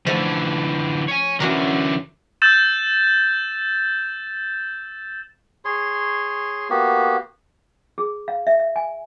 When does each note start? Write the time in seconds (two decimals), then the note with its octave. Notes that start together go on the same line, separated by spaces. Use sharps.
0.06 D3 E3 F3 A3
1.08 C#5 G#5
1.40 D3 E3 C#4 F#4 A#4
2.42 E6 G6 A6 E7
5.65 G#4 C#5 C6
6.70 A#3 B3 F#4 G4
7.98 G#4
8.28 F5
8.47 E5
8.59 E5
8.76 G#5